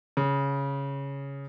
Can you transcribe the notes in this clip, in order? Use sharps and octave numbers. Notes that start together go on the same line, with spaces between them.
C#3